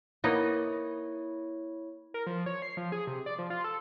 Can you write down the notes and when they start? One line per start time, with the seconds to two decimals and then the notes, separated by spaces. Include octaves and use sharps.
0.24 A#3 B3 D#4 E4 C#5
2.14 A#4
2.27 F3
2.46 C#5
2.62 C7
2.77 F3
2.92 G#4
3.07 C3
3.26 D5
3.39 F3
3.50 F4
3.64 A4